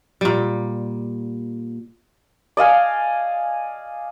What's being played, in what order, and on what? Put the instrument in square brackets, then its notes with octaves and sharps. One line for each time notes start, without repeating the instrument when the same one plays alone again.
[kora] A#2 G3
[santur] D5 D#5 F5 G#5